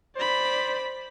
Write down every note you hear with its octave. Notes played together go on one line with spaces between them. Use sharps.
C5 D5 B5